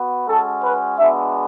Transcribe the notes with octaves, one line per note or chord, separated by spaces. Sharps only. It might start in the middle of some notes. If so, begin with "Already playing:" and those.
Already playing: B3 F#4
G#3 C#4 F#4 A4
B4
G#3 B3 D4 F#4 E5